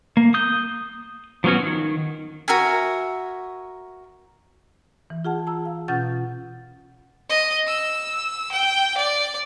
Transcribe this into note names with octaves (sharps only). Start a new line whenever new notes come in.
A#3
D#6 G6
F3 F#3 B3 C#4 F#4
D#3
F#4 A#4 E5 G#5
E3
F4 G#4 F#5 A5
A5 A#5 E6
F5
B2 C#4 F4 F#5 G6 A6
D#5
E6
G5
D5